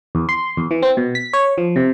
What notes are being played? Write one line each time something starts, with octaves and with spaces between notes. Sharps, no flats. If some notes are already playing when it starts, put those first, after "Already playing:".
E2
C6
E2
E3
C4
B2
B6
C#5
F3
C3